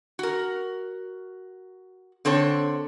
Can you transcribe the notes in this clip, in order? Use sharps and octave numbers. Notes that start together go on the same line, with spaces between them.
F#4 A#4
D3 C4 A4 C#5